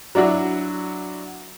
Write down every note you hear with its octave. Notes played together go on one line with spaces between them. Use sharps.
F#3 D4 E4 F#4